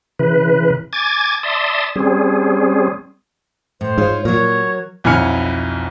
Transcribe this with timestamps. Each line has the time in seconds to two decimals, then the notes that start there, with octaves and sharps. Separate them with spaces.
0.19 C#3 E3 B4
0.93 G#5 D6 G#6 A6
1.43 D5 E5 A5 C6 D#6
1.96 G3 C4 C#4 G#4
3.81 A2 C5
3.98 G#2 F4 C#5
4.25 A#2 F#3 A#4 C#5
5.04 B1 F2 E4 G#5 F6 C#7